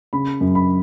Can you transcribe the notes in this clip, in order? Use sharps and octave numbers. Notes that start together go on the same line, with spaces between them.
C#3 B5
F#2
B5